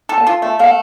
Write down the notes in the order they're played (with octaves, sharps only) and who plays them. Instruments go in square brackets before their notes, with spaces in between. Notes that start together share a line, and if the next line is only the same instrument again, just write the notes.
[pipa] A4
[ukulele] A5
[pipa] F4
[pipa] A3 [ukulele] A5
[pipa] A3 [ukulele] F5
[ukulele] F#5